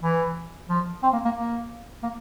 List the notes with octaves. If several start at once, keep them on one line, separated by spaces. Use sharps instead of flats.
E3
F3
C4
A#3
A#3
A#3
A#3